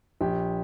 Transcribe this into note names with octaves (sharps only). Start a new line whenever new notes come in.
A#1 G4